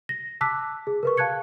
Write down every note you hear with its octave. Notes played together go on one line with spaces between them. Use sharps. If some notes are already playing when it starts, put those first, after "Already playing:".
A#6
A5 D6 E6 F#6 B6
G#4
A#4 B4 C#6
F5 A5 F#6 G#6 C#7